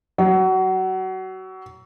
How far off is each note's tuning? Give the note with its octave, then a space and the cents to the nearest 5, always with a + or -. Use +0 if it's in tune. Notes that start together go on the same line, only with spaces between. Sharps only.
F#3 +25